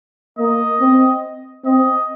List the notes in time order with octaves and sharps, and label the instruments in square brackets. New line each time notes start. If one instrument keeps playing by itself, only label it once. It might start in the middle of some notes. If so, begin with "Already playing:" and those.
[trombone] A#3 [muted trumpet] D#5
[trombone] C4
[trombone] C4 [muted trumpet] D#5